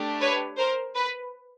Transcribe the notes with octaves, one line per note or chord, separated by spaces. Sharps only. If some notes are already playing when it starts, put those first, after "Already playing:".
Already playing: A3 D4 G4
B4 C#5
A#4 C5
B4